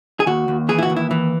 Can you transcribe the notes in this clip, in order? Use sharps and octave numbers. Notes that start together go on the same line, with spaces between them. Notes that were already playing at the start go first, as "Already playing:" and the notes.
G#4
D#2 F#4
D#2
E3 G#4
E4
F#4
D#2
E4
E3